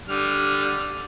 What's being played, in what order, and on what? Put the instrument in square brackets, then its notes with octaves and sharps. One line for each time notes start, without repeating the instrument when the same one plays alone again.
[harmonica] D3 G3 F6